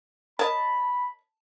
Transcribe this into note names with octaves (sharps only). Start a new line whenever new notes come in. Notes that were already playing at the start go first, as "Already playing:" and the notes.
A#4 C#5 D#5 A5 B5